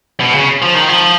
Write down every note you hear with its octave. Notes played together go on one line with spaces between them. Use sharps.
B2
C#3
F3
D#3
F3